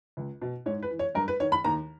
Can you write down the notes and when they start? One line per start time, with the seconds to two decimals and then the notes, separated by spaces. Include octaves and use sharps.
0.17 C#2
0.41 B2
0.66 G#2 C#5
0.83 B4
0.90 E3
0.99 C#5
1.15 G2 A#4
1.28 B4
1.40 D#3 C#5
1.52 B5
1.64 D#2 A#5